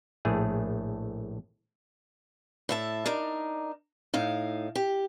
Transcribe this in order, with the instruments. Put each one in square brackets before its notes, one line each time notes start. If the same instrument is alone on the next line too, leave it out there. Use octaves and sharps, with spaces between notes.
[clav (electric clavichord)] A#1 A2 A3 G#4
[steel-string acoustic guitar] A2 E5 A5
D4 D#4 A#4
A2 D#4 F5
G4